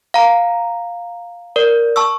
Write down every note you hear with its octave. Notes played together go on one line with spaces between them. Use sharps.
F5 A#5
A#4 D5
A5 C#6 E6